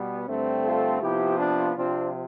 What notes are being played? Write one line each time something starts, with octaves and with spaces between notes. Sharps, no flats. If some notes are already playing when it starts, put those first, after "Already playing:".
Already playing: B2 G3 B3
G2 D3 A3 C4
F4 A4
C3 F3 B3 E4 G4
D4 F4
C3 F3 C4 D4 F4